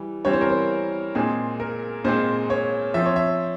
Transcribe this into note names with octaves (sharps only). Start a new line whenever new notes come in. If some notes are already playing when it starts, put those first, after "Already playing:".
Already playing: E3 G3
E3 G3 C4 C#5
C5
A#4
C5
A#2 G#3 C4 G#4
A#4
A#2 G#3 C4 C5
C#5
F3 C4 E5
C#5
E5